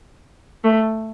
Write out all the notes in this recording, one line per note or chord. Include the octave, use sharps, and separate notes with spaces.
A3